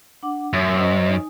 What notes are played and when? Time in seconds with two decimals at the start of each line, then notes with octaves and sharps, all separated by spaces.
0.23 D4 F#5 D6
0.53 F#2 C#5 E5
0.75 C#4 C5 D#5
1.10 D#4 G#5